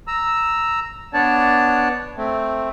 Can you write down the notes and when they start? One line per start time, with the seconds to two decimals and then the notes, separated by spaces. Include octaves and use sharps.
0.07 A#5 E6
1.14 B3 D4 C#5 D5 A5
2.17 A3 C4